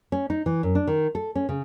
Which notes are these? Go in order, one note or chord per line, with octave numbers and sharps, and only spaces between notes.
C#4
D#4
E3
F#2
D4
D#3
A4
C#4
C#3